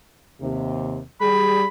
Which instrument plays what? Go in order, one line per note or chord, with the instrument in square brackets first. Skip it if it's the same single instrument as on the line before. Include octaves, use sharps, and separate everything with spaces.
[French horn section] D#2 C3
[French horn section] G3 G#4 [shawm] B5